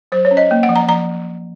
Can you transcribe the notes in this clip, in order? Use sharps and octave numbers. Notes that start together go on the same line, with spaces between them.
F#3 C5
C#5
C#4
D#5
A#3
F#5
F3
A#5
F3 A#5